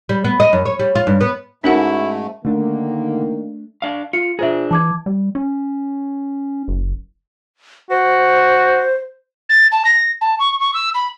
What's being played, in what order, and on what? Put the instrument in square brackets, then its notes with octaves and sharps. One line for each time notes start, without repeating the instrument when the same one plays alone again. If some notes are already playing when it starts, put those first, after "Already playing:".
[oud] G3
B3
D#5
F#2
C#5
G3
F4
G2
B3
[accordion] G#2 A3 [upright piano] C#4 F#4 [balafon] D#4 A#4 F#5 [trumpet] E4
[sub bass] D3 [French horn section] D#3 A#3 [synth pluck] A3 D4
[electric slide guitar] D4 F5
[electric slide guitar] F4 [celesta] C#7
[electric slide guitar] D4 G#4 [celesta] F4 C5 E5
[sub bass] E3 [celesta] A5 D6 G#6
[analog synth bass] G3
C#4
F#1
[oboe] F#4 [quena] C5
[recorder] A6
A5
A#6
A5
C#6
C#6
E6
B5